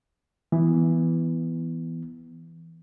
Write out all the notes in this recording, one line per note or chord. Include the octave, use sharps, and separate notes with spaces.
E3 B3